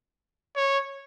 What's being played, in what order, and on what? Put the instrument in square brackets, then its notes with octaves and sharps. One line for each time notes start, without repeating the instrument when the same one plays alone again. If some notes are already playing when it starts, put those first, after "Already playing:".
[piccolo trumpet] C#5